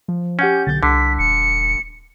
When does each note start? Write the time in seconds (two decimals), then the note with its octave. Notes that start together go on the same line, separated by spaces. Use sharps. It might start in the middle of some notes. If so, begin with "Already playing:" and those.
0.08 F3
0.39 C#4 G4 F#5 G#5 G6
0.67 B1 D3 G6 A6
0.83 C2 D3 B6 C7
1.19 D#1 C#7